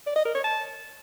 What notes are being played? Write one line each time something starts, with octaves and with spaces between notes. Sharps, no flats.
D5
D#5
A#4
C#5
A5